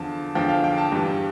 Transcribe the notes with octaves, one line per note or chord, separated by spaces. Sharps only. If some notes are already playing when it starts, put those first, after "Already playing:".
Already playing: E2 D3 F3 A5
E2 D3 F3 G5
F5
G5
A5
G2 E3 G3